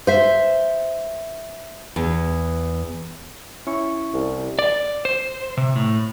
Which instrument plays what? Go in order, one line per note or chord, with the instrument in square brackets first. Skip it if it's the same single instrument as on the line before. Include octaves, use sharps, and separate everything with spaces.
[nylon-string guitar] C5 E5
E2
[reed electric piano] C#4 E4 C#6
[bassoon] C2
[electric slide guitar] D5
C5
C3
A2